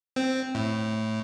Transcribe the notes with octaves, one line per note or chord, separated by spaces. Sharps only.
C4
A2